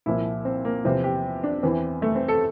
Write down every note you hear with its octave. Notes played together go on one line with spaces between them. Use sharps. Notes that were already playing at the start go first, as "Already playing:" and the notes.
C2 A#2 F3 E4
C4
A#3
E2 C3 F3 C4
G4
D4
E2 E3 C4
A3
C4
A4